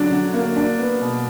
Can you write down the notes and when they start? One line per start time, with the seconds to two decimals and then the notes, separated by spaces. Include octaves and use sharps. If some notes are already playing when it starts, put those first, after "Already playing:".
Already playing: D3 F#3 D4
0.11 D3
0.34 A#3
0.56 D4
0.79 B3
1.01 B2